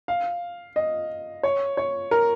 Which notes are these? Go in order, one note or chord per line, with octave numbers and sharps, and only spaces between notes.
F5
D#5
C#5
C#5
A#4